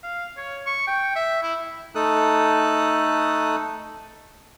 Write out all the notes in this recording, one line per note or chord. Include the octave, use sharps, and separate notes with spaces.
F5
C#5
C#6
G5
E5
E4
A3 D#4 A4 D#6 F#6